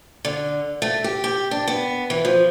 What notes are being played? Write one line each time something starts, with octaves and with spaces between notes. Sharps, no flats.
D3
A3
G4
G4
D4
B3
E3
F3